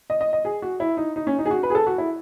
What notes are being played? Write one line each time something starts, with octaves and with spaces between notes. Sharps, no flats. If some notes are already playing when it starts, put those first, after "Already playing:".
D#5
D#5
D#5
G#4
F#4
E4
D#4
D#4
C#4
D#4
G#4
F#4
B4
G#4
A4
F#4
E4